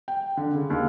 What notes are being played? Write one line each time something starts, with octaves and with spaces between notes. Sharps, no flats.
G5
D3
C#3
D#2